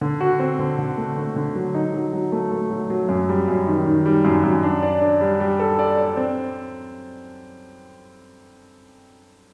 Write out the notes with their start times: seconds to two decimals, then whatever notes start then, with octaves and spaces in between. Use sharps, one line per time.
0.01 D3
0.21 F#4
0.39 C4
0.59 D3
0.79 D3
0.98 A3
1.17 D3
1.36 D3
1.55 F#3
1.75 D#4
1.94 F#3
2.13 F#3
2.32 A3
2.51 A3
2.70 F#3
2.90 F#3
3.09 F#2
3.29 G3
3.48 F#2
3.67 D#3
3.86 D#3
4.06 G3
4.25 F#2
4.44 F#2
4.63 D4
4.82 D5
5.02 D4
5.21 G3
5.40 G3
5.60 A4
5.79 D5
5.98 D5
6.17 C4